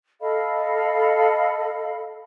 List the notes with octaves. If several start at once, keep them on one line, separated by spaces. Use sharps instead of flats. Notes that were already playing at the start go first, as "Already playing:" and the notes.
A4 D#5 F5 B5